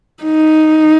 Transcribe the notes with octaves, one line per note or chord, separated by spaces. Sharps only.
D#4